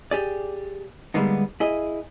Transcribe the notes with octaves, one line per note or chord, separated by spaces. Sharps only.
G4 G#4 D5
D3 G3 G#3 A#3 B3 D#4
E4 G#4 D#5